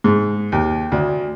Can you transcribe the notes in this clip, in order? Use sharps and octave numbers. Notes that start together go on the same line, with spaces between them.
G#2
D#2
D2